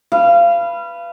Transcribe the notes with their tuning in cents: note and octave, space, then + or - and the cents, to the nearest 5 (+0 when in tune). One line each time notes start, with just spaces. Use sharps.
B4 +0 F5 -30